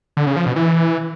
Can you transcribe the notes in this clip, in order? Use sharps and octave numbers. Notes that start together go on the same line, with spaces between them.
D3
C#3
F3
B2
E3